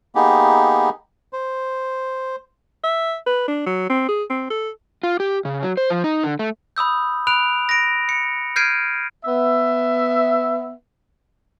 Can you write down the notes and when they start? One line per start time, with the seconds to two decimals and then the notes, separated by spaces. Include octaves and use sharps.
0.15 A#3 B3 D#4 G4 G#4
1.33 C5
2.84 E5
3.26 B4
3.48 D4
3.66 F#3
3.89 C4
4.09 G#4
4.30 C4
4.50 A4
5.03 F4
5.20 G4
5.45 C#3
5.63 F#3
5.77 C5
5.90 F3
6.04 D#4
6.24 D3
6.39 A3
6.76 B5 D#6 E6 G6
7.27 B5 F#6 D7 F7
7.69 A#6 D7
8.09 C#7
8.56 F6 G6 G#6 C7 D7 D#7
9.25 B3 E5